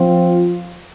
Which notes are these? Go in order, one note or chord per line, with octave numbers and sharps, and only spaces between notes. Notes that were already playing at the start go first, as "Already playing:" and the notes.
Already playing: F3 C4 F4